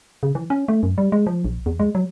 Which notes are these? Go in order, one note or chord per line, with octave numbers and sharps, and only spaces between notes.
C#3
E3
C#4
A3
F#2
G3
G#3
F3
A#1
E2
G#3
F#3